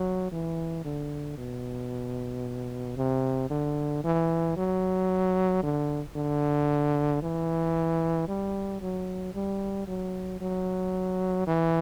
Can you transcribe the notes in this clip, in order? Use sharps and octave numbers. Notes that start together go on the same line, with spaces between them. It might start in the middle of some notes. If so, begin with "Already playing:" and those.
Already playing: F#3
E3
D3
B2
C3
D3
E3
F#3
D3
D3
E3
G3
F#3
G3
F#3
F#3
E3